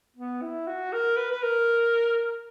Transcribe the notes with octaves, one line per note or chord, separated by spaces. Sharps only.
B3
E4
F#4
A#4
B4
B4
A#4